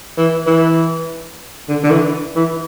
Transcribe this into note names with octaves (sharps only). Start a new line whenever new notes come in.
E3
E3
D3
D3
E3
E3